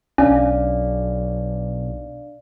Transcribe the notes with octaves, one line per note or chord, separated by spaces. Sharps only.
B1 C#4 D4 D5 F5